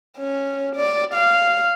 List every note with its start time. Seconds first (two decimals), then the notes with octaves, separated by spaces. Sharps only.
0.18 C#4
0.76 D5
1.14 F5